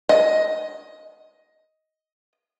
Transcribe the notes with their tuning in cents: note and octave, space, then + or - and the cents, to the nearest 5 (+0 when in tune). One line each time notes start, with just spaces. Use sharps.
D#5 +10